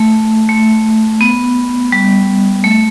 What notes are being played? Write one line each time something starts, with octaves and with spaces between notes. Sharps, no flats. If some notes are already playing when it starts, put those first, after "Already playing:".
Already playing: A3
A3
B3
G3
A3